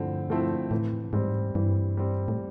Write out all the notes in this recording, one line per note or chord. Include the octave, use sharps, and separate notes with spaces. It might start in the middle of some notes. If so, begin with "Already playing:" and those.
Already playing: G2 D3 F3 A3 C4 E4
F3 A3 C4 E4
A2 E3
G#2 G3 C4
G2 E3
G3 C4
A2